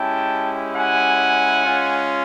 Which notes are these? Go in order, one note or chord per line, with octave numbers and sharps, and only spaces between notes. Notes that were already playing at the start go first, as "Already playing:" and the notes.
Already playing: G#3 C#4 E4 G4 G5 A5
F#5 G#5
G#3 C#4 F4